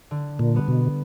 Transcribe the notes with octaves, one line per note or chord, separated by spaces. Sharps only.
D3
A#2
G3 B3
B2